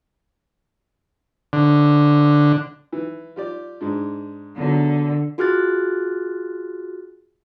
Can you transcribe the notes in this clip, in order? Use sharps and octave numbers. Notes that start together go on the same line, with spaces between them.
D3
E3
F4 G4 D5
G#2 G#3 D4
E2 D3 F#3
F4 F#4 G#4 F6 F#6 A6